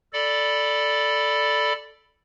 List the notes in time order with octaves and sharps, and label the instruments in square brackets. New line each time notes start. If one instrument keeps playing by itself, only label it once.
[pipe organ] A4 D5 B5